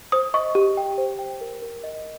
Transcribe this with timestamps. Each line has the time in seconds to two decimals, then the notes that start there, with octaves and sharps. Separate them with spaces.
0.12 C5 D#6
0.34 D#5 C#6
0.55 G4
0.77 G5
0.98 C5
1.19 G5
1.41 A#4
1.62 A#4
1.84 D#5